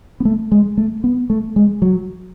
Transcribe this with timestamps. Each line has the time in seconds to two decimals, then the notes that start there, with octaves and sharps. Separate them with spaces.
0.20 B3
0.25 A3
0.52 G#3
0.77 A3
1.04 B3
1.30 A3
1.56 G#3
1.82 F#3